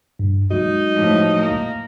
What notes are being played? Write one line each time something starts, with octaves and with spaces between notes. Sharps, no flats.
G2
F#3 G#3 D#4 F#4
A2 F3
A#3